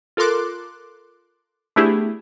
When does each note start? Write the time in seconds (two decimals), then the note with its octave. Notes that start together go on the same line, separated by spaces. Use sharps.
0.17 F4 A4 A#4 C6 D6 F#6
1.76 A3 B3 D4 E4 G4 G#4